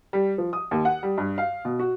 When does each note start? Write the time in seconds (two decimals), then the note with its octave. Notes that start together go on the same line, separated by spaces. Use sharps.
0.13 G3
0.38 F3
0.53 D#6
0.71 D#2
0.85 F#5
1.03 G3
1.18 G2
1.38 F5
1.65 B2
1.79 F#4